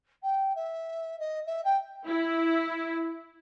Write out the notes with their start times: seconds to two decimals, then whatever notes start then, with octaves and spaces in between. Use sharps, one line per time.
0.23 G5
0.55 E5
1.19 D#5
1.46 E5
1.64 G5
2.05 E4